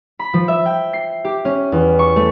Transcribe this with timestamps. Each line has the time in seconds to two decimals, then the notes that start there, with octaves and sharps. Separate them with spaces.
0.19 B5
0.34 F3
0.48 E5
0.66 G5
0.93 C7
1.25 G4
1.45 C#4
1.72 E2
1.99 C#6
2.16 A3